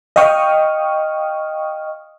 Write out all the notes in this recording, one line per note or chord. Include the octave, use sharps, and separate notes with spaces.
D#5 F5 G5 C#6 D#6 F6